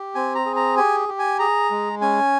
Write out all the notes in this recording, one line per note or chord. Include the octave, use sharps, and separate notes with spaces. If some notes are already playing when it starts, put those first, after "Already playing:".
Already playing: G4
C4 G#5
A#5
G#4
A#5
G4 G#5
G4
G#5
G#4 A#5
G#3
C#4 G#5